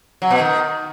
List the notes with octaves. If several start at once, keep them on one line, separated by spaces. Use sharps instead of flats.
F#3
B2
D#3